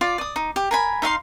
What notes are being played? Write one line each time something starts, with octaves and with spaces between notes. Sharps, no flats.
F4 D5 D6
D5 D#6
D#4
G4
A#4 G#5 B5
D#4 E5 F5 C6